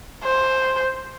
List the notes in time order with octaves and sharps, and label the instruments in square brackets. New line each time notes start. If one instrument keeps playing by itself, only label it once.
[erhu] C5